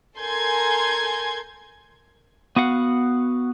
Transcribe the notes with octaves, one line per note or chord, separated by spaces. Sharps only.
A4 A#4 G#5 C6 G6 G#6
B3 F#4 F5 F#5